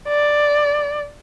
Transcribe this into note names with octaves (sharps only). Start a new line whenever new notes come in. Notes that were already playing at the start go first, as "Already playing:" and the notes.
D5